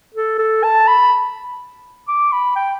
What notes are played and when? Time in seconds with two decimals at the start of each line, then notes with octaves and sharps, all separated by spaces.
0.14 A4
0.39 A4
0.64 A5
0.88 B5
2.08 D6
2.32 B5
2.56 G5